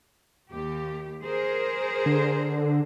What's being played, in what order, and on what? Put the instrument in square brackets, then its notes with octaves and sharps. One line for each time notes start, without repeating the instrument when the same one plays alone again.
[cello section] D#2 G4
G#4 A#4 C5
[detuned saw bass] D3